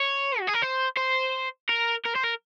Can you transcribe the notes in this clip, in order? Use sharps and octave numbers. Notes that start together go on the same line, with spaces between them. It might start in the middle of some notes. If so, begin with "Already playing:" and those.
Already playing: C#5
F#4
G#4
A#4
C5
C5
A#4
A#4
C5
A#4